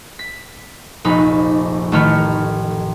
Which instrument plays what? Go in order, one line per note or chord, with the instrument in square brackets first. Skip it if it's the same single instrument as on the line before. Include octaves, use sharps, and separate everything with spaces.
[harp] B6
F1 A#1 D#4 B5
A1 D#3 A3 B5 F6 C#7